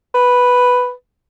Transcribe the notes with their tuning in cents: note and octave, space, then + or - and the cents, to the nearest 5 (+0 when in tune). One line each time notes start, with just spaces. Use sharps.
B4 +0